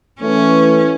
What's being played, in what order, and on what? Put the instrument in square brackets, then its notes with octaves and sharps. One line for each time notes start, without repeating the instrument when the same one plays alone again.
[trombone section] E3 A3 [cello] C#4